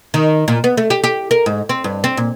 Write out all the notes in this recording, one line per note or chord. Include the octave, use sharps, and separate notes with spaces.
D#3
A#2
B3
A3
G4
G4
A#4
G#2
C4
G2
C4
A#2